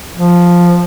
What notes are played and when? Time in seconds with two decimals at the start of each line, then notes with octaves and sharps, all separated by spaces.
0.16 F3